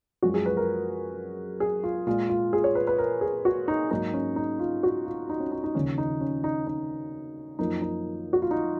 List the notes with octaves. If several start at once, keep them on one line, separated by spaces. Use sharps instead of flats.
F#2 F3 G#3 F#4
G#4
B4
A#4
G#4
F4
A#2 G#3 F4
F4
G#4
C#5
B4
B4
A#4
G#4
F#4
D#4
G#2 F#3 A#3 D#4
C#4
D#4
F4
F#4
F4
D#4
C#4
D#4
D#4
D#2 C#3 F3 C#4
D#4
C#4
D#4
D#4
F#2 F3 A#3 D#4
D#4
F#4
F4
D#4